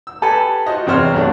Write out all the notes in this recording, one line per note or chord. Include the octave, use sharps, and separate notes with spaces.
E6
G4 A4 B4 G#5 A5
F4 F#4 C5 D#5 F5
E2 C3 C4 C5 C#5 F6
B1 B2 F#3 A3 D4